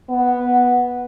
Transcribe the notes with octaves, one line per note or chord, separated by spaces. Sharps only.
B3